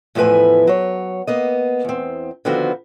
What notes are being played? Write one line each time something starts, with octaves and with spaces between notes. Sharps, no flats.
E2 A2 F3 E4 B4 G#5
F#3 C#5
A#3 B3 D#5
E2 C4
D3 D#3 F3 B3 C4 F#4